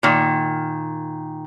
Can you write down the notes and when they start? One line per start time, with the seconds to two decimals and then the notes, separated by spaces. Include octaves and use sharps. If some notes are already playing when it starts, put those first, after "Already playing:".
0.03 A#2 D#3